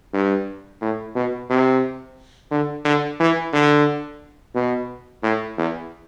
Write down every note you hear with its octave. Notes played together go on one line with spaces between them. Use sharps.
G2
A2
B2
C3
D3
D3
E3
D3
B2
A2
E2